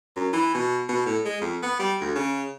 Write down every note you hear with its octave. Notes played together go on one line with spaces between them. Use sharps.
F#2
E3
B2
B2
A2
G#3
F2
B3
G3
D2
C#3